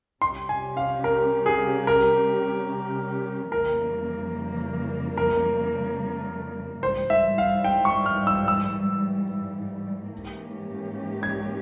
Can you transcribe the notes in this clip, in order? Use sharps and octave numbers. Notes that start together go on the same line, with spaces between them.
C3 G3 C#4 G4 C6
G#5
F5
A#4
G#4
A#4
F2 C#3 E3 G3 A#3 A#4
A#4
G#2 E3 G3 C5
E5
F5
G5
C#6
F6
E6
E6
G#2 E3 A#3 C#4 G4
G#6